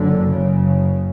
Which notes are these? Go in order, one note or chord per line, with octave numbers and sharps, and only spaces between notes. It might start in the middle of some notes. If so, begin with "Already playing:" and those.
Already playing: F#1 F#2 D3
F#1 F#2 C#3